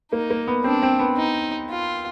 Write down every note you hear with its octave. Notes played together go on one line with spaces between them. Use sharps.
A#3 D#4
A#3
B3
C4 D4
C4
B3
D#4
F4